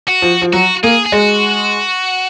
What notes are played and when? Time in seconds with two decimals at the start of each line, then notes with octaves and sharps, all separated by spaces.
0.08 F#4
0.22 F3
0.42 F3
0.53 F#3 F#4
0.83 A#3 G#4
1.06 G#4
1.12 G#3 F#4